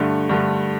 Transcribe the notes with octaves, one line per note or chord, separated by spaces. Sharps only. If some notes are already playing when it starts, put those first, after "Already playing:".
Already playing: G2 D3 A3
G2 D3 A3